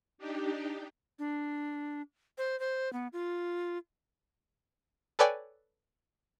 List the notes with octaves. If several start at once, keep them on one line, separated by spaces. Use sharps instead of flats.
D4 D#4 G4
D4
C5
C5
B3
F4
A4 B4 C#5 D5 G5 G#5